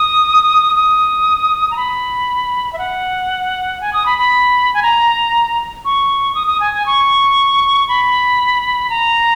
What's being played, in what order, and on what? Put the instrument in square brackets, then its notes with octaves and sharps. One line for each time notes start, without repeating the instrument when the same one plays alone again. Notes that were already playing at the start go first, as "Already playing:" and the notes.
Already playing: [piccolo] D#6
D#6
A#5
B5
E5
F#5
G#5
D#6
B5
B5
G#5
A#5
C#6
D#6
D#6
G#5
G#5
C#6
B5
A#5